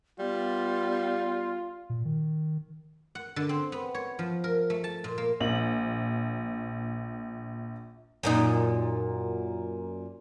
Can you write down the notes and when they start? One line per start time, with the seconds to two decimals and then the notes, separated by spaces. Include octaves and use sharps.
0.19 G3 B3 F4
1.90 A#2
2.05 D#3
3.15 F#5
3.36 D3
3.49 C4
3.72 B3
3.95 C#5
4.19 F3
4.44 A#4
4.70 A3
4.84 A5
5.04 A#2
5.18 A#3
5.40 A#1 F#7
8.23 F#2 A#2 D#4